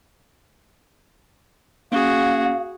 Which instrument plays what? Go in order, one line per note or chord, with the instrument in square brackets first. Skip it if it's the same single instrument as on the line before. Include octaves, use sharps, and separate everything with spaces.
[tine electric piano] A#3 C#4 [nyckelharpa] F#4 G#4 [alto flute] F5